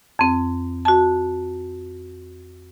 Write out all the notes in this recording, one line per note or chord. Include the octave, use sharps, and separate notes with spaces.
F2 C4
F#4 A5